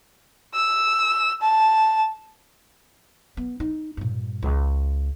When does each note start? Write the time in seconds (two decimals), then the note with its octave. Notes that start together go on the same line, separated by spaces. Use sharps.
0.54 E6
1.42 A5
3.37 B3
3.60 D#4
3.97 G2 A#2
4.42 C#2